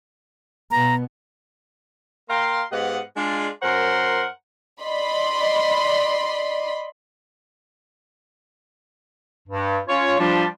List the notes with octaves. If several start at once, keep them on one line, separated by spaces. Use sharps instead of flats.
B2 B3 A#5
A#3 F5 G5 A#5 C6
G#2 B3 G4 D#5 F5 F#5
G#3 D4 F4
F#2 A#4 C5 F#5 A#5 C6
D5 D#5 B5 C6
G2
C#4 F4 C#5
F3 G3 D4 F4